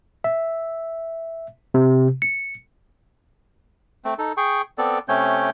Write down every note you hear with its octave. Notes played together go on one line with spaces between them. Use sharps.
E5
C3
C#7
A3 C4
D#4 A4
G#4 G5 C#6
B3 C4 A4 D5
C3 A3 C4 C#4 C#5 G6